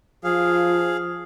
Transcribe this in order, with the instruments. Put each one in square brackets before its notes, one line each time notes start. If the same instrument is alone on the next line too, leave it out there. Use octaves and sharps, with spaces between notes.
[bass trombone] F3 [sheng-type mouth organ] G#4 F5